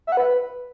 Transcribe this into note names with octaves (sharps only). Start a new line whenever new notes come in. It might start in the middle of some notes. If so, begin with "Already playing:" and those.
E5
F#5
B4